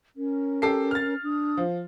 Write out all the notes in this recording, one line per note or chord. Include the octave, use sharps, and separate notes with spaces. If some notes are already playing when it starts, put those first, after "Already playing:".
C#4 A#4
G4 A4 C7
F6 A6
D4 D#6
F3